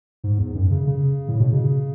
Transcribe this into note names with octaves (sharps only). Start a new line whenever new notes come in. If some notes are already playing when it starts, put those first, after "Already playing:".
G#2
E2
F#2
C#3
C#3
A2
B2
C#3